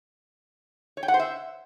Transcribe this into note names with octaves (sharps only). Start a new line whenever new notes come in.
C#5
G5
F#5
C5
E5